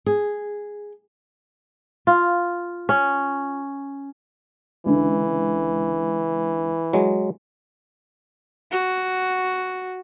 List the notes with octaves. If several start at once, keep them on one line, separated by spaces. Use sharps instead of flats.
G#4
F4
C#4
C#2 D3 E3
F#3 G#3
F#4